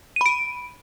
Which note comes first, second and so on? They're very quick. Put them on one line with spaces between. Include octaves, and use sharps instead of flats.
D#7 B5 D7